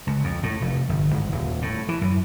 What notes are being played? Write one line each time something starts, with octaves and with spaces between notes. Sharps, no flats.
C#2
F2
A2
F1
G1
G#1
D#1
A2
E3
F#2